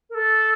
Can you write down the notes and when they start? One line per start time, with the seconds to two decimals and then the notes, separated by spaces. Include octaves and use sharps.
0.10 A#4
0.15 A4